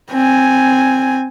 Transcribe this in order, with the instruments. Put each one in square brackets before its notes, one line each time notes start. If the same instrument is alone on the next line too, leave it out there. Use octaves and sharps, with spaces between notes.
[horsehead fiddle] C4 G#5